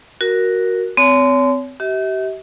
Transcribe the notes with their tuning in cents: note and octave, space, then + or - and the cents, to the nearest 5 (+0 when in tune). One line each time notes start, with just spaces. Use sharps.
F#4 +0 A#4 +0
C4 -30 C#5 +35 G#5 +45
G4 -35 E5 -40